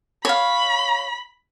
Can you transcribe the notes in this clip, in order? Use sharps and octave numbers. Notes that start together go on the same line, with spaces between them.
C#5 F5 B5